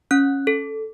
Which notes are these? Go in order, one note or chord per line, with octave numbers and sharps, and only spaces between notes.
C#4 F#6
A4